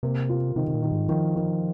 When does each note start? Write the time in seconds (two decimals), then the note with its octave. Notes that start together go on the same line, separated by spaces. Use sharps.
0.03 C3 A#3
0.29 F4
0.56 C3 D#3
0.68 C3
0.74 A#2
0.82 D#3
0.92 G#2
1.09 D#3 F3
1.36 D#3